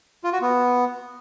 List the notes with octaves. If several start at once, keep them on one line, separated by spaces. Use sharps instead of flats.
F4
F#4
B3